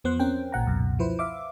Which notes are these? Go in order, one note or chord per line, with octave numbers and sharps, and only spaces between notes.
E2 F3 B3 C5 C6 F#6
C4 C#4 A#4 G5
A1 A#2 F#5 A#5
C#2 F#2 B2
F3 E4 B4 C5
E5 F5 D6